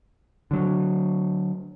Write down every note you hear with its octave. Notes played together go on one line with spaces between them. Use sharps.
D3 F#3